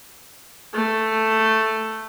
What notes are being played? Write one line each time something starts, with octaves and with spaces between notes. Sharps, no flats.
A3